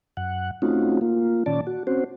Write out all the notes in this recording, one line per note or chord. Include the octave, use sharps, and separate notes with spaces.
F#2 F#5
A3 C4 C#4 D#4 F4 F#4
A#3 F4
A#2 D#3 C#4 D5 A5
F#4
C4 C#4 F#4 C5